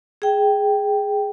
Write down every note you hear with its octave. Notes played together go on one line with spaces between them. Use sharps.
G#4 G5